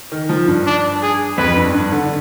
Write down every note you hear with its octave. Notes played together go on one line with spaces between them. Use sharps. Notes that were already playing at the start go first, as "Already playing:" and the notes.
D#3
F3
G2
D4
G#4
F2 B4
G2
G2
D3